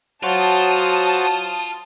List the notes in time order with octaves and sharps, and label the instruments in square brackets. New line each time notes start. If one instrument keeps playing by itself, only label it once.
[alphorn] F#3 [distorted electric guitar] F4 [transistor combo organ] F#4 C5 [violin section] A5 D#6